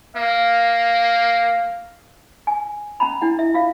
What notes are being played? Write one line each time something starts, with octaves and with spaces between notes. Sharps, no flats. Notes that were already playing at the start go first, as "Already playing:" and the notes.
A#3 F5
G#5
C#4 A#5 B5
D4 E4 F#5
E5
F4 F5